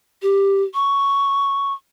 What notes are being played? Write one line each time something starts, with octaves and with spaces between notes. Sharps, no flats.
G4
C#6